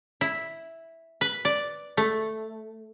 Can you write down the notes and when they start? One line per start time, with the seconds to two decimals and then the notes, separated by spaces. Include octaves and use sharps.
0.21 E4
1.21 B4
1.45 D5
1.97 A3